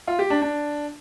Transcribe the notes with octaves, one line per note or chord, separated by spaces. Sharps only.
F4
G4
D4
D4